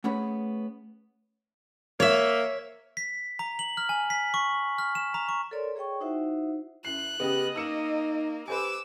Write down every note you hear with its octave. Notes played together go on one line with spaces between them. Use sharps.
A3 B3 C#4 G#4 B4
A#3 C#5 E5
B6
A#5
F#7
F6
G#5
B6
C#6
F6
E7
A#5
C#6
A4 A#4 C#5 D5 C6
G#4 C#5 D#5 G5 C#6
D#4 E4 F#4 C5 E5 F#5
F#2 E4 F#6 C7
C#3 B3 G4 D#5
A#3 D#4 E6 C#7 E7
G4 B4 C5 G#5 D6 E6